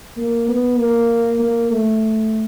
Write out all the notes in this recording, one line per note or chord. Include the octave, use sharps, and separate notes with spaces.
A#3
B3
A#3
A#3
A3